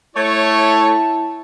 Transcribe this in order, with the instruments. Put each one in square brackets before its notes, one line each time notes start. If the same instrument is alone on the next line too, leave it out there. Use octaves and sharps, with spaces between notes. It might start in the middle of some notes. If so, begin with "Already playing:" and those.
[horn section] A3 C#5 [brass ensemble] E4 A5